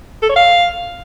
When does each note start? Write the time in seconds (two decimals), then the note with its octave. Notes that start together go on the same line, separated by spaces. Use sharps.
0.22 A4
0.29 C#5
0.36 F5